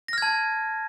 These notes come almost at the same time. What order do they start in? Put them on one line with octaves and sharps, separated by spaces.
A#6 F6 G#6 A5